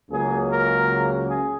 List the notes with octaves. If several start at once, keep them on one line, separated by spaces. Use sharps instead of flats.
C#2 C#3 F#3 A#3 G#4
A#4
G#4